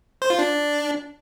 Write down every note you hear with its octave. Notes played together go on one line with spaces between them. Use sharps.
C5
F4
D4